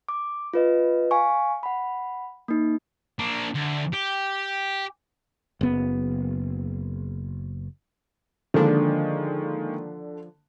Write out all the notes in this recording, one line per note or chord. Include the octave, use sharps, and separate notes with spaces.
D6
F4 B4 D#5
F5 G#5 C#6
F#5 B5
A#3 D#4
A#3 D4
D2
G4
F#1 B3
D3 D#3 F3 G#3 A#3 D4